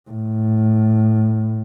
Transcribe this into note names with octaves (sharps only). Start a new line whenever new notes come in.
A2